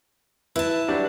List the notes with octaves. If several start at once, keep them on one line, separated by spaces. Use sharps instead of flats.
E4 B4 A5
F#3 G3 D4